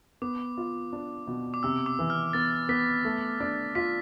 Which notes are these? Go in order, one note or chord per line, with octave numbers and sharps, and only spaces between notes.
B3 D6
F4
D4
B2
D6
C3 E6
D6
E3
F6
B3 A6
B3 B6
A3
D4
F4 B6